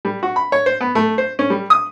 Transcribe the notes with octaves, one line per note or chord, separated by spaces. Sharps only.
G3
F#4
B5
C#5
C5
B3
A3
C5
C#4
G3
D#6